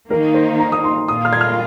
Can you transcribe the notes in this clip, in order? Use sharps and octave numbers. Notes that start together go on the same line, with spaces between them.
D#3 A#3 D#4 A#4
C5
A#5
D#6
C6
A#2 A#3 F4 D#6
F6
G#6
F6